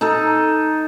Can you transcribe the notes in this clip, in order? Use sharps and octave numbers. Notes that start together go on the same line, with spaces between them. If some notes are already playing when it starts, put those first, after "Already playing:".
D#4 A4